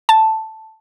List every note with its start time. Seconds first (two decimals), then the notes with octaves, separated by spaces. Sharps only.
0.09 A5